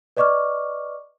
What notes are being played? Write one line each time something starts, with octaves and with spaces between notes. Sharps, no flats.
B4 D5 D#5 C#6 D6 F6